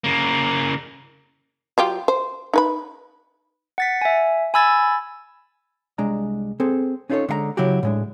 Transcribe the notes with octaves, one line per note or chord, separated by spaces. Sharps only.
C#3 A#3
F#3 F4 G4
C5
D#4 B4 B5
F#5 A6 B6
E5 G#5
G#5 B5 E6 G#6 A6
C2 G#3 D4 A#5
C4 G#4 A4
C#4 D#4 F4 G#4 A4 C#5
D3 G#3 F5 A#5
C#3 F#3 E4 F#4 G4
A2 G#3 D4